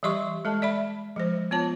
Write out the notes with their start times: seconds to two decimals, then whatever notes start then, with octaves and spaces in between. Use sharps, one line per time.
0.03 E3 G3 G4 D#5 C6 C#6
0.45 G#3 A4 D#5 A5
0.62 D5 E5 B5
1.16 F3 G#3 C5
1.51 B3 F4 C#5 A5